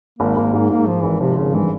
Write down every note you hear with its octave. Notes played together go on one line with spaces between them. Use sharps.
G#1 A#3
G#1 A#3
G#2 A#3
G#2 A#3
G#2 F3
G#1 E3
C3 F3
G#1 C#3
G2 E3